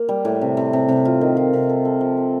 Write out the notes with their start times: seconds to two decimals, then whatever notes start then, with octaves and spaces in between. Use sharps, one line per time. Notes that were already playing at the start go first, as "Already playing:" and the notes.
Already playing: A#3
0.09 G3
0.25 A2
0.41 C3
0.57 C3
0.73 C3
0.88 C3
1.05 F4
1.21 D#3
1.37 F4
1.53 C3
1.69 A4
1.85 A4
2.01 F3
2.17 A4